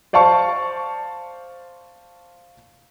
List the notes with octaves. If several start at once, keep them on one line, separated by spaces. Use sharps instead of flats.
C5 D5 F5 A5 C#6